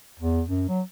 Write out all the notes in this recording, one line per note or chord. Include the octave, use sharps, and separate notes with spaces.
E2
F#2
F#3